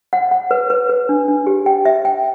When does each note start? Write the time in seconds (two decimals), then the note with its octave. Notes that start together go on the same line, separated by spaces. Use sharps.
0.13 F#5
0.31 F#5
0.51 B4
0.70 B4
0.89 B4
1.09 D4
1.28 D4
1.47 G4
1.66 G5
1.85 E5
2.05 G5